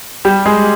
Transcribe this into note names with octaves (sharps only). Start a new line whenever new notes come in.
G3 G4
G#3 G#4